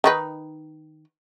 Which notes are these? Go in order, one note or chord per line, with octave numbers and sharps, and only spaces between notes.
D#3 D#4 B4